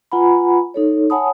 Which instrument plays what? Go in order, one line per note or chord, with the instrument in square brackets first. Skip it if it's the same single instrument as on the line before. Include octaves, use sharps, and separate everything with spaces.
[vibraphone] F4 B4 F#5 G#5 A#5 B5
D#4 A4 C#5
C#5 F#5 G#5 A5 B5 D#6